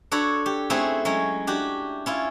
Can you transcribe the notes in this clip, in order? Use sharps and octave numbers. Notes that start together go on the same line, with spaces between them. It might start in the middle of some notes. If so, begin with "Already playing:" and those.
D4 F#4 A4 C#5 B5
G4
A3 C4 C#4 E4 F#4 G#4
F#3 G#3 C#4
D4 F#4 G4
C#4 E4 F4